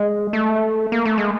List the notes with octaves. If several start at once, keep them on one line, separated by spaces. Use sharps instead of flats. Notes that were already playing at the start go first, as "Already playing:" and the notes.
Already playing: G#3
A3
A#3
A3
G#3